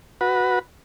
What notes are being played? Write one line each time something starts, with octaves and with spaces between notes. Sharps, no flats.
F#4 B4